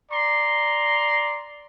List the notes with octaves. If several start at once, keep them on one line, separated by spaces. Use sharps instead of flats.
D5 A#5 C6